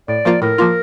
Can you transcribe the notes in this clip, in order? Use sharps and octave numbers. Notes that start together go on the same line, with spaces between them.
A2 D5
F3 A#3 F4
A2 A#4
F3 A#3 F4